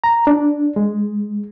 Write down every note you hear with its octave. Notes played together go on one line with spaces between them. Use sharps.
A#5
D4
G#3